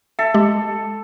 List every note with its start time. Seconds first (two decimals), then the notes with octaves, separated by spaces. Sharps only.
0.19 A4 E5
0.34 G#3 G4